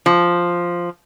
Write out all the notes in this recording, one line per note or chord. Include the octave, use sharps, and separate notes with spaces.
F3